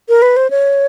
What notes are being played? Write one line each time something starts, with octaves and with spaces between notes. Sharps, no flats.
A#4
B4
C5
C#5